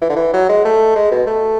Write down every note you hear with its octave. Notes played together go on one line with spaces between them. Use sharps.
E3
D3
E3
F#3
G#3
A3
G#3
B2
A3